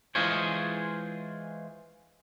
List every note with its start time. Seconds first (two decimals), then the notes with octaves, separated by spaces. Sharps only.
0.15 E3 G#3 F4 G#4 C5 C#5